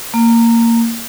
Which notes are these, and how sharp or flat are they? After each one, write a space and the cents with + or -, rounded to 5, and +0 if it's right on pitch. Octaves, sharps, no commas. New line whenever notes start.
A#3 -15